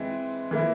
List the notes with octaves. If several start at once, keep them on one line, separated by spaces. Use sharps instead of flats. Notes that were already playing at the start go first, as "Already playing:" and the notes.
Already playing: E3 G#3 C4 E4
E3 A#3 E4